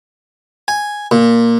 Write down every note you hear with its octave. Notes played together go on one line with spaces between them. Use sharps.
G#5
A#2